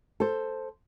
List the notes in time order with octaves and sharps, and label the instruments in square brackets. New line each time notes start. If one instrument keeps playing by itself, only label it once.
[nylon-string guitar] A4 C5